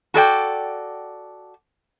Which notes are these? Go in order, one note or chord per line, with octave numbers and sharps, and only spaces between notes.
F#4 A4 D5 G5